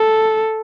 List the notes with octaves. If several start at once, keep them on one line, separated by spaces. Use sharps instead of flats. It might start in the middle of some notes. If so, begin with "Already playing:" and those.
Already playing: A4